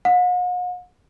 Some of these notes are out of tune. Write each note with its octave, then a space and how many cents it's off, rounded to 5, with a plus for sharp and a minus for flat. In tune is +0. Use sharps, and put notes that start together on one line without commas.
F#5 -45